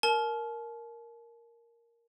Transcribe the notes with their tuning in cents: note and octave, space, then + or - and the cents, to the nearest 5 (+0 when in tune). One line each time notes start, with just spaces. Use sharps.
A#4 +0 A5 -45